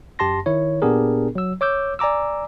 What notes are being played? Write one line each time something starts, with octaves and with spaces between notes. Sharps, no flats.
F#2 G4 A5 C6 A#6
D#3 E4 C#5
A#2 B3 D4 G4 G#4 A#4
F#3 E6
C#5 D6 E6 G6
D5 G#5 A#5 D6 E6